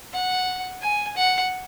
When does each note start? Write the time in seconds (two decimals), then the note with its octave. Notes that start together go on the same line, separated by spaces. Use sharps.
0.13 F#5
0.82 G#5
1.16 F#5